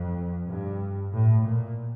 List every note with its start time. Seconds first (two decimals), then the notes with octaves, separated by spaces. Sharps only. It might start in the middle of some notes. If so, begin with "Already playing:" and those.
Already playing: F2
0.48 G2
1.12 A2
1.45 A#2